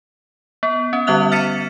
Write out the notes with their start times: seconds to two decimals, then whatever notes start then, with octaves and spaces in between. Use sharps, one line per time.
0.63 B3
0.93 C#4
1.07 D3 G3 B3 E5 F#6 F7
1.32 F6 A6 B6 C#7 D#7 E7